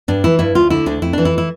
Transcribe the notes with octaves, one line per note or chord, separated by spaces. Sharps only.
G2 D4
E3 E4
G2 E4
D2 F4
D3 E4
D2 D4
F2 E4
E3 D4
E4
E4